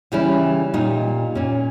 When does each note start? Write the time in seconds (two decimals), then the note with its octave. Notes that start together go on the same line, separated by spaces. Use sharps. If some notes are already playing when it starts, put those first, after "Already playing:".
0.12 C#3 E3 G3 C#4 E4
0.74 A#2 A#3 D#4 G4
1.35 A#2 A#3 C#4